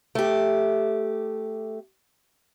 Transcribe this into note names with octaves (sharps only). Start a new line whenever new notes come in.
A3 G4